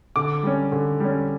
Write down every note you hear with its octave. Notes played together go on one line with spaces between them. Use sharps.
D3 D6
G3 C#4
D3
G3 C#4